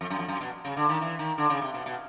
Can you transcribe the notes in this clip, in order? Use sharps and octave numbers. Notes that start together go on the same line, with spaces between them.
F2
F#2
F2
F#2
B2
C#3
D3
D#3
E3
D#3
D3
C#3
C3
B2
B2